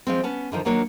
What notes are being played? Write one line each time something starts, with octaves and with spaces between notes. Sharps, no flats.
F3 G#3 C4
B3 C#4 A5
D3 D#3 F3
D#3 F#3 A#3 D4 C#5